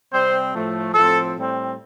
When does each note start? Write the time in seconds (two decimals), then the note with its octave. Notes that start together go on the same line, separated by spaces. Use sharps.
0.13 C3 G3 C4 C5
0.54 A2 F3 A3
0.94 A2 F3 C4 A4
1.35 A2 G3 C4